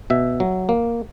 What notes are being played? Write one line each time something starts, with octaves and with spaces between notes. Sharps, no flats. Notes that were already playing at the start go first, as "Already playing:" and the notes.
B2 E5
F#3
A#3